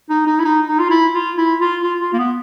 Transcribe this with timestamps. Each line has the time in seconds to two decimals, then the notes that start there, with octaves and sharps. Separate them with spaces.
0.10 D#4
0.27 D#4
0.39 E4
0.45 D#4
0.68 D#4
0.79 F4
0.90 E4
1.14 F4
1.37 E4
1.60 F4
1.83 F4
2.00 F4
2.13 A#3
2.18 B3